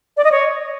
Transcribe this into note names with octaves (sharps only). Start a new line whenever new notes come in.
D5
D#5
C#5